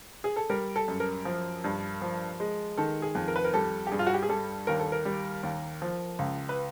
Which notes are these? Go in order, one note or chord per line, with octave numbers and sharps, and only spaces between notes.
G#4
A4
G3 A#4
A4
F#2
A#4
F3
G2
F3
G#3
D#3 A4
G#4
F2
A#4
B4
A#4
G3 A4
G4
G2 G#4
F4
F#4
G4
G#4
G3 A4
D#2 A#4
A4
A#4
G3
D#2
F3
C#2
B4